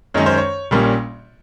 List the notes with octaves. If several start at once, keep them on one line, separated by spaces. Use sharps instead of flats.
F#2 D#3 G#3 C#4 C#5
C5
C#5
A#1 A#2 G3 A#3 C#4